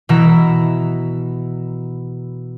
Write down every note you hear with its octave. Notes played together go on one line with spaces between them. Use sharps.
B2 E3 E5 A#5